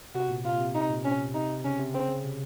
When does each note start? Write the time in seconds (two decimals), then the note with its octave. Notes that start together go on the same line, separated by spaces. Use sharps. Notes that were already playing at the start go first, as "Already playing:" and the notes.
0.15 C3 F#4
0.29 A#2
0.45 C3 F4
0.53 A#2
0.60 C3
0.75 C3 D#4
0.90 A#2
1.05 C#4
1.34 C3 D#4
1.64 C#3 C#4
1.79 C3
1.94 C#3 C4
2.08 C#3
2.24 C3